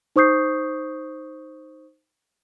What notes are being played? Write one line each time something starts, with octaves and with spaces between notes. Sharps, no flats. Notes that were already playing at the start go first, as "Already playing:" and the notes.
D#4 C5 C#6 D#6 G6 C7